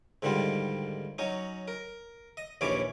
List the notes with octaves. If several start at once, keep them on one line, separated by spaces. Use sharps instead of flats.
G#2 D3 D#3 G3 F4
F#3 C#4 D#4
A#4
D#5
A#1 D#2 E3 C#4 C#5 D6